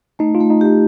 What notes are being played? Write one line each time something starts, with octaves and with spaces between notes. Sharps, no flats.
A3 D#4
F4
A3
D#4
D#4 G4